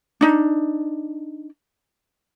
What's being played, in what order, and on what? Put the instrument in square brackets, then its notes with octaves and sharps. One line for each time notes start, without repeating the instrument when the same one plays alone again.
[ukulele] D4 D#4